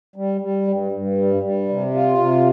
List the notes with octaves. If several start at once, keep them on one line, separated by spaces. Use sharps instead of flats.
G3
G3
G2
G2
G3
G3
C3
F4
C3